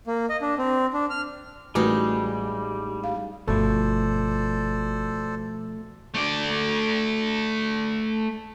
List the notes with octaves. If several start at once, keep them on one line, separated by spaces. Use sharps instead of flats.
A#3
D#5
D4
C4
D4
F6
A1 G3 G#3 D#4 F#4 B4
F5
G1 B2 F3 A3 A4 C5 D5
A3 D5